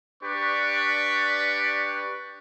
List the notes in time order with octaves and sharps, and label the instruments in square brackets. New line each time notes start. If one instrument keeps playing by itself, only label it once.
[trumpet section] D4 G4 B4 D5 C#6